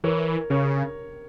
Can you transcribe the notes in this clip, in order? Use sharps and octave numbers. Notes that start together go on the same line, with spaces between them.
E3 A#4 C#5
C#3 A#4 C#5